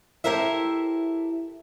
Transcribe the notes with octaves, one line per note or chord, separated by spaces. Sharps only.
E4 G4 A4 A#4 C5 E5